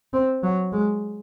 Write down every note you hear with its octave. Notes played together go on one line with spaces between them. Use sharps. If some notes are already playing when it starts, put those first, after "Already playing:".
C4
F#3
G#3